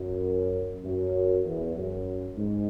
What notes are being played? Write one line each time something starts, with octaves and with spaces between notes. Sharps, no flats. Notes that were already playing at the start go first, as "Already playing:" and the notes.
Already playing: F#2
F#2
E2
F#2
G#2